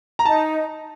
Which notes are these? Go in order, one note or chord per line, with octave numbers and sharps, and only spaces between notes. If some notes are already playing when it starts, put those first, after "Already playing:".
A#5
D#4 A5